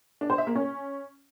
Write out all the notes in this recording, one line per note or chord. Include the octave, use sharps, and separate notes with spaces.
D4
C5
E5
A#3
C#4